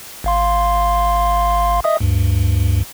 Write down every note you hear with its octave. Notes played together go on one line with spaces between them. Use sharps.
G#1 F5 C6
D#5 E5 D#6
D2 G2